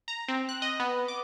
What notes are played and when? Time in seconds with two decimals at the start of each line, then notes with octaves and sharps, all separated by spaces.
0.08 A#5
0.28 C4
0.49 F#6
0.62 D#5
0.80 B3
1.08 D6